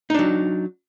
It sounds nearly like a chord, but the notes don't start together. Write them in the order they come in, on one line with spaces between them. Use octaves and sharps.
D#4 D4 F#3